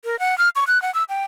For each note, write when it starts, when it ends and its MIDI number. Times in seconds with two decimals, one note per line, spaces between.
0.05 0.19 70
0.19 0.38 78
0.38 0.49 89
0.56 0.64 85
0.67 0.81 90
0.82 0.93 78
0.94 1.03 88
1.09 1.24 79